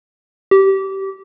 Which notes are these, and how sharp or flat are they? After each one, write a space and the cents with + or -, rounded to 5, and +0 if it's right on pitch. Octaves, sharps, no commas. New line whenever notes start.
G4 -20